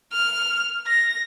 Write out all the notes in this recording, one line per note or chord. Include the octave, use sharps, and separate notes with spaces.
F6
A#6